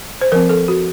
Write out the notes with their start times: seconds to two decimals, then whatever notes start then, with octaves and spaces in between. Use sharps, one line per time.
0.21 C5
0.32 F3 C4 A#4
0.49 A4
0.68 F#4